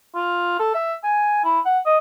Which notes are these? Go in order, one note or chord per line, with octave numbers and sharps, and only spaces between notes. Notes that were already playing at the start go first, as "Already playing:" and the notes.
F4
A4
E5
G#5
E4
F#5
D#5